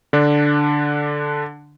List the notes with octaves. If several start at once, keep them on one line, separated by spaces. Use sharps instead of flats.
D3 D4